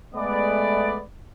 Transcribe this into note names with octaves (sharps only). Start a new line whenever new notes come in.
G#3 A3 B3 D5